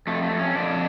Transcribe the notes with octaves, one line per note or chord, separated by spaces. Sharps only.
F2 A3
A3
F2
C#4
F2 D4